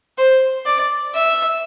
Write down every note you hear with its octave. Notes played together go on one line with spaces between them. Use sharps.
C5
D5
E5